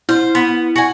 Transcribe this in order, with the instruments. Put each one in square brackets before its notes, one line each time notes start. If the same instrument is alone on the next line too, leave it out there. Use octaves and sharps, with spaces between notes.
[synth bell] E4 [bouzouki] C5
[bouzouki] B3
F#4 G#5